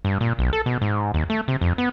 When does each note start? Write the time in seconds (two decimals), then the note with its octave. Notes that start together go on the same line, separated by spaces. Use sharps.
0.05 G2
0.21 A#2
0.39 B1
0.53 A4
0.66 B2
0.82 G#2
1.14 D#2
1.30 A3
1.48 C3
1.61 F2
1.78 B3